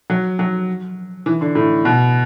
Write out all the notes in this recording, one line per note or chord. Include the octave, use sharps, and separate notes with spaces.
F#3
F#3
E3
D3
A2
B2